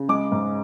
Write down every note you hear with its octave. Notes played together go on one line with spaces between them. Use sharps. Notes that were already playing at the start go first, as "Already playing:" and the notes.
Already playing: C#3
G#3 D6
G#2